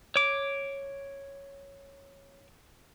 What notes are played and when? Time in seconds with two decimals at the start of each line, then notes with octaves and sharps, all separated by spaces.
0.16 C#5 D6